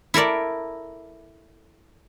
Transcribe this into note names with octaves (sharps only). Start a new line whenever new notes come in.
E4 A4 A#4 D5